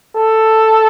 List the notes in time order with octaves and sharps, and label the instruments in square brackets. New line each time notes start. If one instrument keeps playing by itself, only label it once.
[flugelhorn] A4